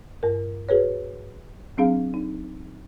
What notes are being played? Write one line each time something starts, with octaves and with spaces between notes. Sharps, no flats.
G2 A#4
F#4 G#4 B4 C#5
F#3 C4 D4 G#4 F5
D#4